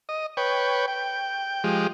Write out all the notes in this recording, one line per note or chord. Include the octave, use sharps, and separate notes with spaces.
D#5
B4 C#5 G5
G5
F3 G#3 G4